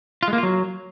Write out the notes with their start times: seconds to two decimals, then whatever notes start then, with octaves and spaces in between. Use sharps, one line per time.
0.23 F4
0.28 G#3
0.33 A#3
0.38 F4
0.43 F#3